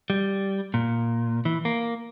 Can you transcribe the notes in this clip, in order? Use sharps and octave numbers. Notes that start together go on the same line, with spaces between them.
G3
A#2
E3
A#3